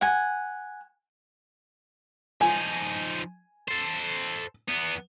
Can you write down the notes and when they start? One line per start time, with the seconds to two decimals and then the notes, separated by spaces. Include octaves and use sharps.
0.01 F#5 G#5
2.41 F3 D#4 G#5
3.68 A4 C5
4.68 E2 B3